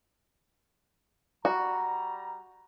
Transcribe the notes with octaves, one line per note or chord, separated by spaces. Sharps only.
G3 F#4 A#5